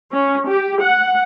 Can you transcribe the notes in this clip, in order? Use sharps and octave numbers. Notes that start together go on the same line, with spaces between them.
C#4
G4
F#5